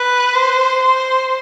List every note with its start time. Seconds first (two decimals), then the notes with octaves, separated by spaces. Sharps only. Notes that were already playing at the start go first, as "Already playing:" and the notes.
Already playing: B4
0.35 C5
0.82 C5